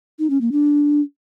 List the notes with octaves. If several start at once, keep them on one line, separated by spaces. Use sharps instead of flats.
D#4
C#4
A#3
D4